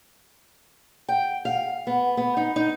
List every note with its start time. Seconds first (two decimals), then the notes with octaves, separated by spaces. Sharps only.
1.08 G5
1.45 F5
1.87 B3
2.17 B3
2.37 D#4
2.56 D#4